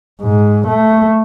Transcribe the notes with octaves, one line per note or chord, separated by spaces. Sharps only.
G#2
A3